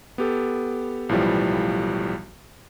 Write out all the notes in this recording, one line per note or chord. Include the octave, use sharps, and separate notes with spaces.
B3 G4 A4
B1 A2 E3 F3 G3